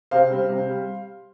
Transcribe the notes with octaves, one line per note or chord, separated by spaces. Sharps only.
C3 C5 F5
G3 C4
C3
G3